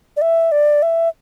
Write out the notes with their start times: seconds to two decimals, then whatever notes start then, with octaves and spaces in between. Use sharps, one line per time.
0.17 D5
0.22 E5
0.52 D5
0.82 E5